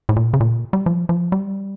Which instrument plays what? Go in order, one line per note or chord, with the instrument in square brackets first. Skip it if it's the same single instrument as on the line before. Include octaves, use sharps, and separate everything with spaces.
[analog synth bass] A2
A#2
C#3
A#2
G3
F3
F3
G3